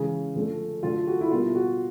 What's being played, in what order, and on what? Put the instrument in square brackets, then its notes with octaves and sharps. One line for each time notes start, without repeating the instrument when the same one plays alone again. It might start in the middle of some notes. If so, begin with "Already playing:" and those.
Already playing: [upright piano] C#3 E3 G#3 G#4
D3 F3 A3
D3 F#3 A3 F4
F#4
E4
B2 G3 A#3 F4
F#4